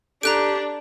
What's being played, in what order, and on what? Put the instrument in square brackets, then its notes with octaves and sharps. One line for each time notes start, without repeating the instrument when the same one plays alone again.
[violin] D4 [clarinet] G4 [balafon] A4 [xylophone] A#5 F#6 D7